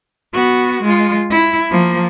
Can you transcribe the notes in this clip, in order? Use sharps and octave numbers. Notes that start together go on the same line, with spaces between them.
B3 F#4
G#3 F4
E4
F3 A#3